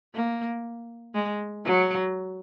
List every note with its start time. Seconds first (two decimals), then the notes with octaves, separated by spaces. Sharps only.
0.14 A#3
1.15 G#3
1.65 F#3